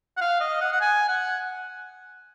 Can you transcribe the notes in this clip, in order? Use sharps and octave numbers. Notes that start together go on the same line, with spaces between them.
F#5
F5
D#5
F#5
F#5
G#5
F#5